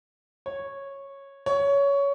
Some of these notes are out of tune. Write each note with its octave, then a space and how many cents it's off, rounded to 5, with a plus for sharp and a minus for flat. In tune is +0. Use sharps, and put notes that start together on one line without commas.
C#5 -10
C#5 +15